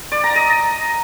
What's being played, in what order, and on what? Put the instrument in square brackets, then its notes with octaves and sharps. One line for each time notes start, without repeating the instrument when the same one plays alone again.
[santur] D5
A#5
D#5